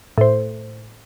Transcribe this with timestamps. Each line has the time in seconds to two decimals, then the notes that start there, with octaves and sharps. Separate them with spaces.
0.18 A2 C5